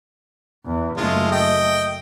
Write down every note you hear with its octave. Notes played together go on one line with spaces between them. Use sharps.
E2
F#1 G#3 A3 F4
D#5 G5